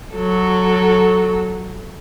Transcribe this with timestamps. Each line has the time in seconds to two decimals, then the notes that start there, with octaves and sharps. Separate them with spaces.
0.14 F#3 A4